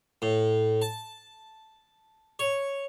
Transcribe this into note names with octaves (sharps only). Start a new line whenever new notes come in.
A2
A5
C#5